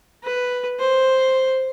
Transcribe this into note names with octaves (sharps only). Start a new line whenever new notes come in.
B4
C5